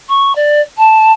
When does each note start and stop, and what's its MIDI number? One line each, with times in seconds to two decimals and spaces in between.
0.09 0.35 85
0.35 0.61 74
0.77 1.12 81